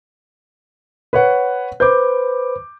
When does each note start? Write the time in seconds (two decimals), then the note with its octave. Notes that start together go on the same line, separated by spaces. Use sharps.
1.13 B4 C#5 F#5
1.80 B4 C5 B5 D6 G6